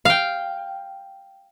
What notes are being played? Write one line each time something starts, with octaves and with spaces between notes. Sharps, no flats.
F5 G5